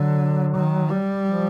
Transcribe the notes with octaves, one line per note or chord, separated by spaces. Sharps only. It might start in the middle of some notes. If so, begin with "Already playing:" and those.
Already playing: D3 F#3
D#3
G3
F3